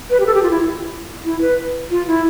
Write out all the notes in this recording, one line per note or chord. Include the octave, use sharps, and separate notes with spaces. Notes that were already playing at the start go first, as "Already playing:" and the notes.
B4
G4
A4
G4
F4
E4
E4
B4
F4
E4